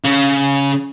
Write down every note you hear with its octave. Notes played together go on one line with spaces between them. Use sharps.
C#3